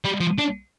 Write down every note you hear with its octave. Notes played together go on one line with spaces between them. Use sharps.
G3
F3
D4